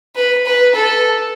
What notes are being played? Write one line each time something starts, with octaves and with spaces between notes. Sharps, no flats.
B4
B4
A4